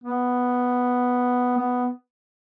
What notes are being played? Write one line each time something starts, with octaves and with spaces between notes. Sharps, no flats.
B3
B3